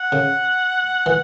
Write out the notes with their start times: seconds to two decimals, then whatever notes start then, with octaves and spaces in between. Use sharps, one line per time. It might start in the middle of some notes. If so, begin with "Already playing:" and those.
Already playing: F#5
0.12 C#3
1.06 E3